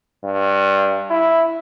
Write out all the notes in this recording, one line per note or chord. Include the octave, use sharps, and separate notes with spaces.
G2
E4